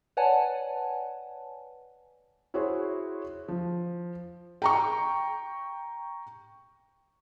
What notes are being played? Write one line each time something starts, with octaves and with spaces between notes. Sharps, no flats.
B4 C#5 D5 F#5 G#5 A5
E4 F#4 G#4 C5 C#5
F3
G5 A#5 C#6